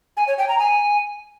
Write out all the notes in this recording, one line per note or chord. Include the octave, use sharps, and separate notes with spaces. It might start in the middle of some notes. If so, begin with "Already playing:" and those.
G#5
C#5
G5
A#5
G#5